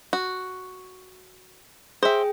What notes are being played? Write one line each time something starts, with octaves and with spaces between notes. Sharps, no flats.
F#4
G#4 C5 E5 G5